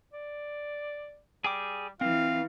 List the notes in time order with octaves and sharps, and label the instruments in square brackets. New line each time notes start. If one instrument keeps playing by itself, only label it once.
[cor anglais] D5
[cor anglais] G3 [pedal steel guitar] G#4 G5 D6
[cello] E3 [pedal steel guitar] C4 [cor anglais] F4 [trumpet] F5